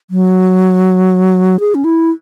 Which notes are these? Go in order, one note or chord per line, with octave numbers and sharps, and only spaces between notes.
F#3
G#4
C#4
E4